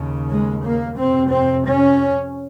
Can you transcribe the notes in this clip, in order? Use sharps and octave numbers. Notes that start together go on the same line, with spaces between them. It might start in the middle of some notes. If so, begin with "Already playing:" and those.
Already playing: D#2 C#3
G#3
A#3
F2 C3 C4
C4
C#4